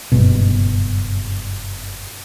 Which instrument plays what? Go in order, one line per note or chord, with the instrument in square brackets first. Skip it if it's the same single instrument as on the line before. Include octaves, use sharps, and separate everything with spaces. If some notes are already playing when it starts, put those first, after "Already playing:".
[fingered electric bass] F#1 G2 B2